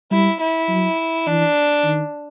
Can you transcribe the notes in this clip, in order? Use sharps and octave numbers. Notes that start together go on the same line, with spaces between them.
G3 E4
E4
F#3
E3 D4
D#3